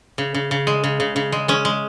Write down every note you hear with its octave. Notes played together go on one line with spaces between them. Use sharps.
C#3
C#3
C#3
G#3
C#3
C#3
C#3
G#3
G#3 C#4
G#3